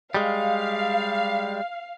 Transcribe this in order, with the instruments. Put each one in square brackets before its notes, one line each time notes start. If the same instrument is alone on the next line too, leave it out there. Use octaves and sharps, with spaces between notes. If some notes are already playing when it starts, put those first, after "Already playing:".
[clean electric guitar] G3 G#3 [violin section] F5